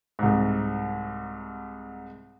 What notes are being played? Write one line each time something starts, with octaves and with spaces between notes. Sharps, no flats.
C2 G#2